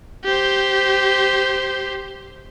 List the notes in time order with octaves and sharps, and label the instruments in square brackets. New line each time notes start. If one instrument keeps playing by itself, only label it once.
[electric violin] G4 C5